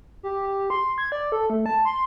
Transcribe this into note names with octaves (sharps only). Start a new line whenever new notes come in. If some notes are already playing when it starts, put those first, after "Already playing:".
G4
G4
C6
G#6
D5
A4
A3
A5
C6